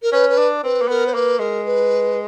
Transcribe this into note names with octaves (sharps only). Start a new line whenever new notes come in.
A#4
C#4 B4
B4
D4
C4 B4
A#3
B3 A#4
C5
A#3 B4
G#3 A#4
B4